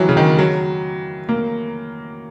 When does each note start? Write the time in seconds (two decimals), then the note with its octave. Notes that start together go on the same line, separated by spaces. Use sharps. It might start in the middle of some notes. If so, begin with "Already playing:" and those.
Already playing: D#3 E3 F#3
0.09 C#3
0.17 D#3
0.39 F#3
1.29 A#3